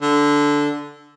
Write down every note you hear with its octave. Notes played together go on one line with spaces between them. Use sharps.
D3